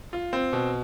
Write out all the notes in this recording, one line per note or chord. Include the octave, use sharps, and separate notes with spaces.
F4
C4
B2